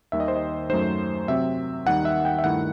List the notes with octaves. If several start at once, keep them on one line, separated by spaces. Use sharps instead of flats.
D#2 D#3 G3 E5
D#5
C5
D#5
F#2 F#3 A3 D#4 C5
C3 F#3 C4 E5
D#2 D#3 G3 D#4 F#5
E5
G5
E5
G2 D#3 A3 E4 F#5